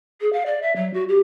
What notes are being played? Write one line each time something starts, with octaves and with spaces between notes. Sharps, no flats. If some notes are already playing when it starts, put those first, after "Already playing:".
G#4
F5
D5
E5
F#3
F#4
G4